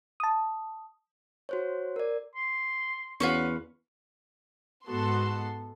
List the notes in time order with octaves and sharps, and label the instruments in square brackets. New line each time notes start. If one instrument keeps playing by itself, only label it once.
[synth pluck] A5 D#6
[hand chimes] F#4 C5 C#5
A#4 D5
[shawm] C6
[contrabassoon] E2 [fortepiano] C#4 F#4 [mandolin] F4 B4 C#6
[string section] G#2 B3 F#4 A4 C6